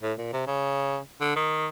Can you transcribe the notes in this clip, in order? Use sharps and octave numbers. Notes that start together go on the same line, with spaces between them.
A2
A#2
C3
C#3
D3
D#3